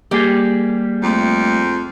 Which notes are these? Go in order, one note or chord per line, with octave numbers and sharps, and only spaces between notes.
G3 A#3 G4 G#4
F2 A3